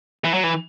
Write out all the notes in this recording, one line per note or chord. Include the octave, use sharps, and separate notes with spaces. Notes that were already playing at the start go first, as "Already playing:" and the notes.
E3
F#3
E3